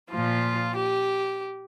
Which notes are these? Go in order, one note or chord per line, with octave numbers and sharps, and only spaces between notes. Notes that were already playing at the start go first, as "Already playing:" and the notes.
A#2 F3 F4
G4